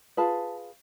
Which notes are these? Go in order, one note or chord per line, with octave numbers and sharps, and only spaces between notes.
F4 G#4 B4 A5